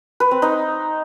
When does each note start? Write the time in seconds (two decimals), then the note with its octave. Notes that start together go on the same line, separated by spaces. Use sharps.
0.20 B4
0.31 C4
0.42 D#4